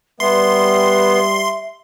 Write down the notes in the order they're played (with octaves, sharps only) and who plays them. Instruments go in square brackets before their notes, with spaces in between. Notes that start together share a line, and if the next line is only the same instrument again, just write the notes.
[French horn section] G3 [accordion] B3 [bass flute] E5 [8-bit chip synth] C6